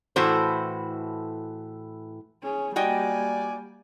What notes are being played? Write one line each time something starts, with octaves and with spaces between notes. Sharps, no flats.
A2 E3 F#4 A4 C5
C#4 G#4
G3 A#3 F#4 D5 D#5 G5 G#5